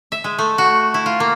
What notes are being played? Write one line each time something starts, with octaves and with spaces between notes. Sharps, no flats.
E5
G#3
A3
F#4
E4
F4
A#3